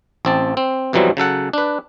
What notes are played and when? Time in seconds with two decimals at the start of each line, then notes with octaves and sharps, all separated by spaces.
0.25 A1 C4 A5
0.57 C4
0.93 F2 B2 E3 F#3 G3 C4
1.17 C#3 F#3 A4 F#5
1.53 D4 B4